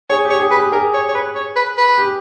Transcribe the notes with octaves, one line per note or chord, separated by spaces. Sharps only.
G#4 C#5
G4
C#5
G#4
B4
G4
G#4 A#4
C#5
C#5
B4
C#5
B4
B4
G4